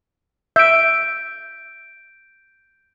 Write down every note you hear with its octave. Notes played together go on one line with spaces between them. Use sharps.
E5 G6 D7